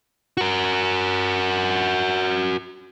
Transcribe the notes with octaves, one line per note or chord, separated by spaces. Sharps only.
F#4 A#4